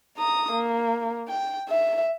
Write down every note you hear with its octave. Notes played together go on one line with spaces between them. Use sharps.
A#5 D#6
A#3
G5
E5